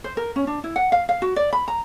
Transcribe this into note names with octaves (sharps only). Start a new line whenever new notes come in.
C5
A#4
C#4
D4
E4
F#5
F5
F5
F#4
D5
B5
A#5